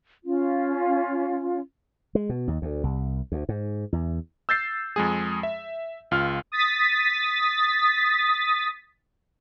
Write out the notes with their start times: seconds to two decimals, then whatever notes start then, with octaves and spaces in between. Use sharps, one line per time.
0.24 C#4 F4
2.15 G#3
2.29 B2
2.48 D#2
2.62 D2
2.84 C2
3.32 D2
3.49 G#2
3.92 E2
4.49 E6 G6 A6 C7
4.96 F2 G#3 G#4
5.43 E5
6.11 C#2 F4 F6
6.52 D#6 A6 B6